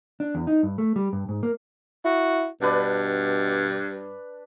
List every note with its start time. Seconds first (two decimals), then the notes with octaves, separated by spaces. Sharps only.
0.20 D4
0.35 E2
0.47 D#4
0.63 G2
0.78 A3
0.96 G3
1.13 G2
1.29 G#2
1.43 A#3
2.05 E4 F#4
2.61 G2 B2 D4 B4 D5